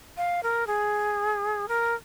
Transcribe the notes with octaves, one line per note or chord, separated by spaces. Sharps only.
F5
A#4
G#4
A#4